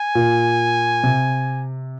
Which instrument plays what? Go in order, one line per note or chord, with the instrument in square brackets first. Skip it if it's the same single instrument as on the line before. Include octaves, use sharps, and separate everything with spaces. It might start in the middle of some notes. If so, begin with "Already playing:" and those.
Already playing: [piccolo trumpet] G#5
[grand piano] A#2
C3